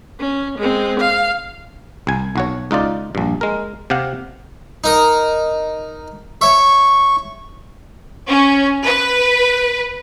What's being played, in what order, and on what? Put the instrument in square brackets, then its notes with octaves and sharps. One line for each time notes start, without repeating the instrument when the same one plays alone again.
[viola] C#4
G#3 C4
F5
[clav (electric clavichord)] C2 G#5
B1 F#4 C#5
C#2 D#4 F4 D5
A#1 G2
G#3 A#4
C3 G4 F5 F#5
[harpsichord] D#4 A#4 D#6
[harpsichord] C#5 E5 [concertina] C#6
[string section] C#4
B4